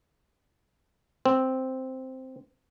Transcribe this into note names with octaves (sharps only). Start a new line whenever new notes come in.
C4